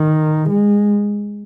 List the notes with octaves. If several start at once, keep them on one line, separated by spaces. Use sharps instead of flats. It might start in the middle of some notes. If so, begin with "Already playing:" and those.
Already playing: D#3
G#3